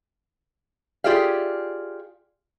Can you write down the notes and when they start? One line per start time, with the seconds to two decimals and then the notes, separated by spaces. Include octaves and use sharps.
1.04 F4 G4 G#4 D5 E5 F5